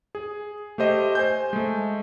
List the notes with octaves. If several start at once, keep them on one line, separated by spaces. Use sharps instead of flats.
G#4
A3 G4 C5 D#5
C5 G#5 G6
G#3 A3